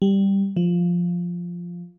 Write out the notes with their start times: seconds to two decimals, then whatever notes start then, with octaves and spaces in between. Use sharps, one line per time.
0.02 G3
0.57 F3